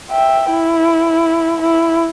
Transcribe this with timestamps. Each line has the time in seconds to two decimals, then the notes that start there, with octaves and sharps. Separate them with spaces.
0.11 E5 G5
0.50 E4
1.61 E4